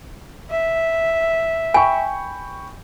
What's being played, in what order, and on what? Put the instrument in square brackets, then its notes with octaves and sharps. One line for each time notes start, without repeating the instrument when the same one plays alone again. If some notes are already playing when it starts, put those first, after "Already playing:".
[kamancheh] E5
[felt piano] G5 B5 C#6 [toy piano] G#5